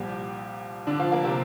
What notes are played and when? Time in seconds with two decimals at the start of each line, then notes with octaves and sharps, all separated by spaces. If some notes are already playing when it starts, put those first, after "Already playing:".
Already playing: C2 A#2 F3 G3 G4
0.87 D3 D4
0.99 F3 F4
1.12 A#3 A#4
1.24 C3 C4